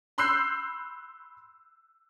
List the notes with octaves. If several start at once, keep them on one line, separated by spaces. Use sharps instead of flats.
B5 C6 E6 F#6 G6 C7